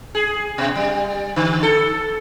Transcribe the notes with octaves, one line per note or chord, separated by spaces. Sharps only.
G#4
B2
G3
D3
A4